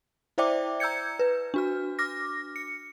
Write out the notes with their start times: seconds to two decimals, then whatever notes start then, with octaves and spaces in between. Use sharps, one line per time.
0.38 E4 C5 D5 E5 G5 D6
0.80 A#5 E6 G6 G#6 C#7
1.19 B4
1.54 D4 F#4 F6
1.99 D6 F6 A#6
2.56 C#7